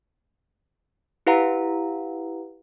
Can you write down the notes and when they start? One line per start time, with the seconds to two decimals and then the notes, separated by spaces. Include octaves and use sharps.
1.27 E4 G4 B4 F5 F#5 A#5